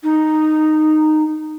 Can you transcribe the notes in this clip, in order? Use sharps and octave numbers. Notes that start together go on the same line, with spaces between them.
D#4